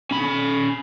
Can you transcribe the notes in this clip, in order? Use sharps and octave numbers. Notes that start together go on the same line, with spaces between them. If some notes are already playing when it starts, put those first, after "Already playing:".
C#4 B5